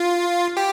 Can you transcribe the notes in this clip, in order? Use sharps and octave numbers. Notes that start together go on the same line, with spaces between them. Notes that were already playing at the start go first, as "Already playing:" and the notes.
Already playing: F4
G4